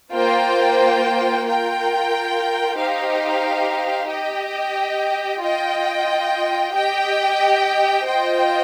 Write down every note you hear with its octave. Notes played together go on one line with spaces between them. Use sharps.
A#3 F4 C5 G5
F4 A#4 G5
D#4 G4 C5 F5
G4 D#5 G5
F4 D#5 G5
G4 D#5 G5
F4 C5 D#5 G5